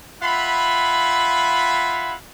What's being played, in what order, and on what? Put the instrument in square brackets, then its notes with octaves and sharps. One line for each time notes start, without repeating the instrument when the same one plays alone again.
[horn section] F4 E5 F#5 G#5 B5